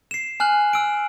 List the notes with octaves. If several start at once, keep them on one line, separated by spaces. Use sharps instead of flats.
C7 E7
G#5 F6 F#6 F#7
E6 D7